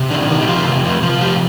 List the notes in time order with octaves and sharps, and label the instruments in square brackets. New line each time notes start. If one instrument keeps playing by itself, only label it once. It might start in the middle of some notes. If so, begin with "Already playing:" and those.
Already playing: [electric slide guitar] C3
D#3 D4
C3 D#4
G4
F3 F4
C3
F3
F3
F4
C3 G4